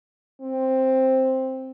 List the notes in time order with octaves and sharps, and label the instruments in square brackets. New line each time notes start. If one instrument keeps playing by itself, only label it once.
[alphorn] C4